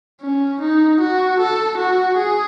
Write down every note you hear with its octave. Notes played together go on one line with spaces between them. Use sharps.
C#4
D#4
F#4
A4
F#4
G#4